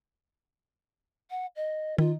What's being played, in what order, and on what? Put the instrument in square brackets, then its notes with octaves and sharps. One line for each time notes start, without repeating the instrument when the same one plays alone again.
[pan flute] F#5
D#5
[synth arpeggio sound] D#3 [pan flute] F4